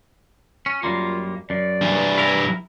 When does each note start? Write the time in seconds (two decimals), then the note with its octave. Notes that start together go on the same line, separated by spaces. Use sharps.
0.66 C#4
0.83 F#2 G3 A#3 F4
1.50 F#2 D5
1.82 G2 E3
2.18 E4 A#4